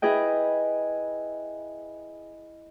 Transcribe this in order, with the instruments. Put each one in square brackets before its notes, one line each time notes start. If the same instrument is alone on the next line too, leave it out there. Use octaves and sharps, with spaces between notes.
[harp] E4 G#4 B4 D#5 G5